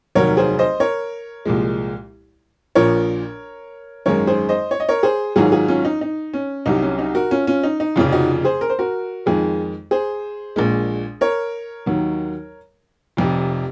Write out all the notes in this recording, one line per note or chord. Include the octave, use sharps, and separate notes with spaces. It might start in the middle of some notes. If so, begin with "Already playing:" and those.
F1 D#2 D#3 F#3 A#4 C#5
G#4 C5
C5 D#5
A#4 C#5
C2 A#2 F3 G#3
A#1 A#2 F3 A#4 C#5
G#1 F#2 D#3 G#3 A#4 C#5
G#4 C5
C5 D#5
C#5
D#5
A#4 C#5
G#4 C5
G#1 G#2 F#3 F4 G#4
F4 G#4
C#4 F4
D#4
D#4
C#4
C2 C3 F#3 D#4
C#4
D#4
F#4 A#4
C#4 F4
C#4 F4
D#4
D#4
F1 F2 C#3 F3 C#4 F4
D#4 F#4
G#4 C5
A#4
C5
F#4 A#4
F2 D#3 G#3 F4 G#4
G#4 C5
A#1 A#2 G#3
A#4 C#5
D#2 D#3 F#3
F1 F2 C3